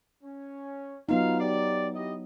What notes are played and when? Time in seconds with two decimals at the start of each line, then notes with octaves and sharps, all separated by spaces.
0.23 C#4
1.09 F#3 B3 D#4 F4 F5
1.40 G4 D5
1.94 E4 G4 D#5